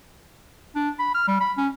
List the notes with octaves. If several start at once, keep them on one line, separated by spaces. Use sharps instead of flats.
D4
B5
F6
G3
B5
C#4